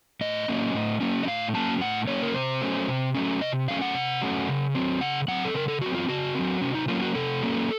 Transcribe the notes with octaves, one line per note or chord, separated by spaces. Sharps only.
A2 D#5
F#3 A#3 C#4
A2
F#3 A#3 C#4
D#5
A2 F5
F#3 A#3 C#4 A5
A2 F#5
F#3 A#3 C#4 C#5
A#4
C3 C5
F#3 A3 C#4
C3
F#3 A3 C#4
C3 D#5
F#3 A3 C#4 F5
F#5
C3
F#3 A3 C#4
C#3
F#3 C4
C#3 F#5
F#3 C4 F#5
A4
C#3 A#4
A4
F#3 C4 F#4
F4
C#3 F#4
F#3 C4
C3 C#4
D#4
F#3 A#3 C#4 F4
F#4
C3 A4
F#3 A#3 C#4